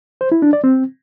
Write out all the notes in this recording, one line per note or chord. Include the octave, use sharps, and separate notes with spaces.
C5
E4
D4
D5
C4